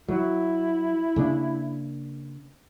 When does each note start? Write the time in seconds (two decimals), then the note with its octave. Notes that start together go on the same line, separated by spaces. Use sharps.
0.08 F#3 E4
1.16 C#3 A#3 D4